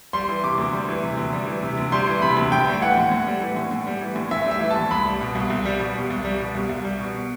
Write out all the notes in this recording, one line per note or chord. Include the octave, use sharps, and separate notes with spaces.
G3 C6
E3
C3 D6
D2
G3
E3
C3
D2
G3
E3
C3
D2
G3 C6
E3
C3 B5
D2
A2 G5
G3
E3 F#5
A2
A2
G3
E3
A2
A2
G3
E3
A2
A2 E5
G3
E5
E3
A5
A2
C2 B5
G3
B2
C2
C2
G3
B2
C2
C2
G3
B2
C2
C2
G3
B2